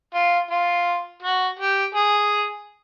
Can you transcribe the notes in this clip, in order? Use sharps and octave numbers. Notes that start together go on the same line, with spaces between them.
F4
F4
F#4
G4
G#4